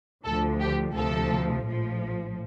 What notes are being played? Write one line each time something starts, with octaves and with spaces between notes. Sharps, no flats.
D2 D3 F3 A4
G4
D2 C3 F3 A4
A#1 A2 F3